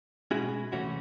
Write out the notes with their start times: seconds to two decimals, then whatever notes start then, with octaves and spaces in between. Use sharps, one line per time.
0.31 B2 G#3 C#4 E4 F#4 G#4
0.72 C3 E3 A3 C#4 E4 F#4